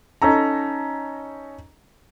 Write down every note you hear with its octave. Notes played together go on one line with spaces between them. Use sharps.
C#4 D#4 A4 A#5